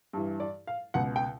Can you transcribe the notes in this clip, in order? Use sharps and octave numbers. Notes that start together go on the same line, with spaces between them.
G2 E3
D5
F5
C#2 B2 F#5
G5